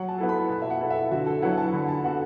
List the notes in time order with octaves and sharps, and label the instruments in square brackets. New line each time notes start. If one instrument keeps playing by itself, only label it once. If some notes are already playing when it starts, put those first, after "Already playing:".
Already playing: [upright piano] F#3 [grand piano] F#5
[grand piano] A5
[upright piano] B3 E4 A4
[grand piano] B5
[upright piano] B2 [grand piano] A5
[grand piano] E5
F#5
[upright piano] B3 E4 A4
[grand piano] E5
[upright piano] D3 [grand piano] F#4
[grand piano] A4
[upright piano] F#3 B3 E4 [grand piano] F#5
[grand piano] F#5
A5
[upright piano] D3 [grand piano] B5
[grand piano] A5
[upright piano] B3 F#4 A4 [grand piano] F#5